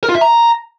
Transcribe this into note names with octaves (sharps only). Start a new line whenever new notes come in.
A#4
F4
E5
A#5